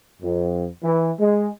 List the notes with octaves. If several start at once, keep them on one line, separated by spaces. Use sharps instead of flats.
F2
E3
G#3